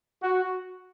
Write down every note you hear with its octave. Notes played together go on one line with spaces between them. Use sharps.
F#4